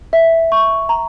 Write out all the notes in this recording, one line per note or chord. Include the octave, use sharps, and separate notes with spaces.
E5
C#6
A#5